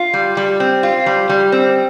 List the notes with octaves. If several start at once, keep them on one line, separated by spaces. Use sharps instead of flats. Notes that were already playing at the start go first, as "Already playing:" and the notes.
Already playing: F4
G3
G3
C4
F4
G3
G3
C4